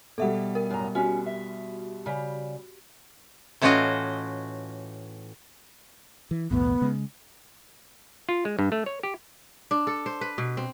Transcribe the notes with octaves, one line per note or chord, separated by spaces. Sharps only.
B2 G3 A4 E5 F#5
A#4
F#2 A2 A#5
C#4 F#4 G4
E5
C#3 G3
A2 E3 C#4 F4 F#4 D#5
E3
B1 E2 A2 B3
C#3 G#3
F4
G#3
G2
A3
C#5
G4
D4
A4
C5
B4
B2
C4